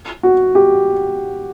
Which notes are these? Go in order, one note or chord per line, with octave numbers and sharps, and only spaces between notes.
F#4
G4